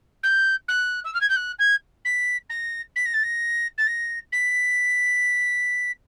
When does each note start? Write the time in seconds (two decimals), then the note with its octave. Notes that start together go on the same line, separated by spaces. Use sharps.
0.23 G6
0.68 F#6
1.04 E6
1.14 F6
1.21 G#6
1.29 G6
1.36 F#6
1.59 G#6
2.05 B6
2.49 A#6
2.96 B6
3.05 A#6
3.13 A6
3.23 A#6
3.78 A6
3.87 A#6
4.32 B6